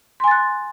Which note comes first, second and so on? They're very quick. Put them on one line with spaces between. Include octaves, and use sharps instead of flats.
C6 G#5 A6 F#6